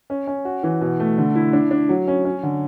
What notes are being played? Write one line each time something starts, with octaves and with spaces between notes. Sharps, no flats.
C#4
C#4
F#4
E3
B2
A3
D3
E4
D4
D4
F#3
C#4
C#4
D3